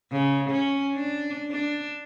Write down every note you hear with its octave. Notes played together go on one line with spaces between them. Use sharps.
C#3
C#4
D4
D4